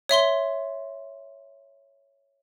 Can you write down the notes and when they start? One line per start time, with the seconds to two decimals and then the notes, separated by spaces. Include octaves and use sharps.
0.09 C#5 E5 C6 G7